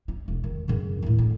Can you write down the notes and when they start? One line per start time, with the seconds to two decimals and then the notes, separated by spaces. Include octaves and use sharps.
0.08 D#4
0.28 E1
0.44 D#3
0.68 F#2 C#3
1.03 D#2 A2
1.19 D3